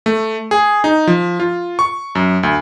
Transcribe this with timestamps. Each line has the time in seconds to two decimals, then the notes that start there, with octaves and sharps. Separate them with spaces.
0.06 A3
0.51 G#4
0.84 D#4
1.07 F3
1.40 F4
1.79 C#6
2.15 F#2
2.43 D2